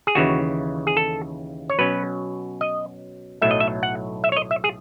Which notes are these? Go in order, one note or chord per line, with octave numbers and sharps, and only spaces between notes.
G#4
D#2 C#3 E3 F#4
G#4
A4
C#5
B2 F#3 C#4 B4
D#5
B1 A2 F#3 A3 E5
D#5
E5
F#5
E5
C#5
D#5
E5
G#4